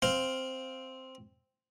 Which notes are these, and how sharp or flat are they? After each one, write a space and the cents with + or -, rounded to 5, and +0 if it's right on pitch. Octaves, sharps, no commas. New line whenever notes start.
C4 +0 F5 +0